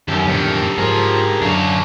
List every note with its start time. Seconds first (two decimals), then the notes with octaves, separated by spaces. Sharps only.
0.08 F#2 D#3 G4 A4
0.24 B1 F2 A2 D3 D#3
0.78 G#2 F3 G#4 A#4
1.42 F#2 D3 D4 F#4 F5